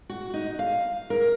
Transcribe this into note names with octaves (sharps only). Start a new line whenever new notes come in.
F#4
D#4
F5
A#4